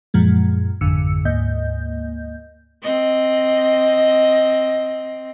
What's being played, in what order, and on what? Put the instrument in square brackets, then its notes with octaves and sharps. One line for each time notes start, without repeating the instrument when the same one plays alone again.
[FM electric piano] F#2 A#2 F3 G#3
G#1 F2 G#2 D3 E6 C#7
D2 G#2 A#3 D#5 G6
[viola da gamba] C4 D#5